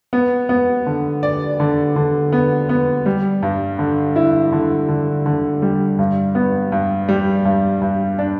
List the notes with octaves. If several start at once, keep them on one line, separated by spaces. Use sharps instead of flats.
B3
B3
D3
D5
D3
D3
B3
B3
G3
G2
D3
E4
D3
D3
D3
G3
G2
B3
G2
G3
G2
G2
D4